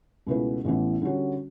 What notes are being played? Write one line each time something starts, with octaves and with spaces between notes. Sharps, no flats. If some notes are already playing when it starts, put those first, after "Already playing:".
C#2 B2 A3 E4 B4
A1 A2 E3 B3 E4
D3 G3 C#4 F#4